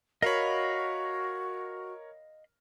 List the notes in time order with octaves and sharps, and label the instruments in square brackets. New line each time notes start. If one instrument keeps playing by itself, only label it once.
[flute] F#4 [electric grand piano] A#4 C#5 [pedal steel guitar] D#5 F5 B5